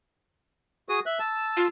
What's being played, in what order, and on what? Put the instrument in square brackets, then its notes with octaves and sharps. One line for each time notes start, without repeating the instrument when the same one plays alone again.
[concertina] F#4 G#4 D#6
E5 F#6
A5 E6
[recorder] F4